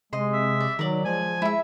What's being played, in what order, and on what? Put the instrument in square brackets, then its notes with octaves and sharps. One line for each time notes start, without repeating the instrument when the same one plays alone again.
[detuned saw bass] C3 [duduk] G#3 [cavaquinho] D#5 C6
[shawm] E5
[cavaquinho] D5
[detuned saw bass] D#3 [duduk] F#3 [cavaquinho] A#4 D5
[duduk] F3 [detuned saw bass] G#3 [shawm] G#5
[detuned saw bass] G#3 [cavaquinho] E4 E5